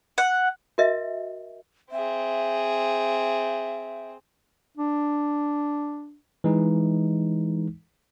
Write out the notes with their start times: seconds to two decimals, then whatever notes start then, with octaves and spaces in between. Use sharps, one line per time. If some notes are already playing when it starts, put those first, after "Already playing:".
0.18 F#5
0.78 F#4 A#4 D#5 E5
1.92 C4 G#4 E5
4.77 D4
6.44 E3 G#3 D#4